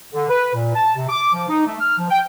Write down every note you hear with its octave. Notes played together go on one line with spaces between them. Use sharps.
D3
B4
A#2
A5
C3
D6
F3
D#4
A3
F6
F3
G5